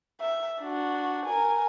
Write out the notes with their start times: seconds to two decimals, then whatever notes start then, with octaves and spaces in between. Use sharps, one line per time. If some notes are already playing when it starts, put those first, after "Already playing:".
0.21 E5
0.62 D4 F#4
1.26 A#4 G#5